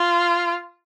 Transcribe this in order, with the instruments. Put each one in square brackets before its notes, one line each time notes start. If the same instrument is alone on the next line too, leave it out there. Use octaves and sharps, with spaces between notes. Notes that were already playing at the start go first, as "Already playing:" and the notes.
Already playing: [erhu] F4